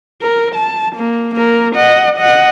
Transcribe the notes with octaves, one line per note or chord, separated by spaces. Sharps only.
A#4
A5
A#3
A#3 A#4
D#5 F#5
D#5 F#5